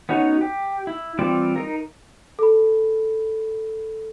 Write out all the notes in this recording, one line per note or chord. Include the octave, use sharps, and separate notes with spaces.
B3 C#4 D#4 F#4 C#5
G4
E4
E3 G3 C4 F4 D5
D#4 A#4
A4 B5